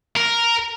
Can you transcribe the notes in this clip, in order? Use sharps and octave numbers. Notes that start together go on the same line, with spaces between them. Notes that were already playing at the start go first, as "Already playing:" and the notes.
A#4